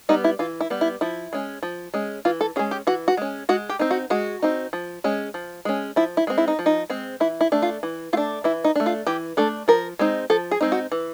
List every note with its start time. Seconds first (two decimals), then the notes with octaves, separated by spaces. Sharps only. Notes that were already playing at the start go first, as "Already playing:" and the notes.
0.09 G3 B3 D#4
0.24 E4
0.39 E3 F4
0.61 E4
0.70 G3 B3
0.81 E4
1.01 F3 E4
1.33 G#3 C#4
1.63 F3
1.94 G#3 C#4
2.25 E3 F4
2.41 A4
2.56 C#4 G#4
2.59 G#3
2.71 G4
2.87 E3 F#4
3.08 F#4
3.17 G#3 C#4
3.49 G#3 F#4
3.69 G4
3.79 C4 D#4
3.91 F#4
4.10 G#3 F#4
4.42 C4 D#4
4.73 F3
5.04 G#3 C#4
5.34 F3
5.65 G#3 C#4
5.96 F3 E4
6.17 E4
6.27 G#3 C4
6.38 E4
6.48 D#4
6.59 F3
6.66 D#4
6.90 G#3 C4
7.20 E3 E4
7.41 E4
7.52 A3 D4
7.62 F4
7.83 E3
8.13 A3 F4
8.17 D4
8.44 E3 E4
8.64 D#4
8.76 A3 D4
8.86 F4
9.07 E3 G4
9.37 A3 D4 A4
9.68 F3 A#4
9.99 G#3 C4 D#4
10.30 F3 A4
10.51 G#4
10.61 G#3 C4 D#4
10.72 F#4
10.92 E3